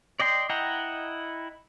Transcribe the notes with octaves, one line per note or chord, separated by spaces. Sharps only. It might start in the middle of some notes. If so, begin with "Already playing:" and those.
D5 D#5 G5 C6
E4 D#5 F#5 G5 A#5